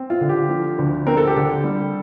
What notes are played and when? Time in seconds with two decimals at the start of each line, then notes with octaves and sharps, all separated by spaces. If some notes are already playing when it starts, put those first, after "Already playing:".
Already playing: C4
0.10 F4
0.21 D3
0.29 G4
0.49 F3
0.78 D2
1.07 C4 A#4
1.17 A4
1.27 G4
1.36 D3 A4
1.64 G3